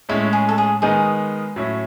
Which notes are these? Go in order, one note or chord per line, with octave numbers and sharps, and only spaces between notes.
A2 G#3 C#4 E4
G#4
A4
G#4
D#3 G#3 B3 D#4 G#4
A2 F#3 C#4 E4